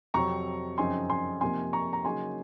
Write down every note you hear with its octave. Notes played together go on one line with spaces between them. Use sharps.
F2 C3 F#3 C4 A#5 C#6
F#2 C#3 F3 C4 D#4 G#5 C6
G#5 C6
C3 F3 A#3 D#4 G#5 C6
A#5 C#6
A#5
C#3 F#3 A#3 D#4 G#5 C6